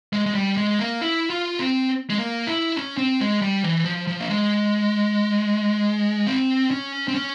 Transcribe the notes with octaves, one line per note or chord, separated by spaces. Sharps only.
G#3
G#3
G3
G#3
A#3
E4
F4
C4
G#3
A#3
E4
C#4
C4
G#3
G3
E3
F3
F3
A#3
G#3
C4
C#4
C4
C#4